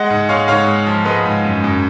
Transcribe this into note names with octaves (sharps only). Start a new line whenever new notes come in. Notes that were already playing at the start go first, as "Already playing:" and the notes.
Already playing: G#3 D#5 F#5
G#2
G#3 C#5 F5
G#2 C#5 F5
G#3
F3
G#3 B4 D#5
G#2
F#2
F#2